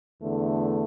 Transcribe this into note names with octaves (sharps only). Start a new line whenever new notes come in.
E2 D3 A3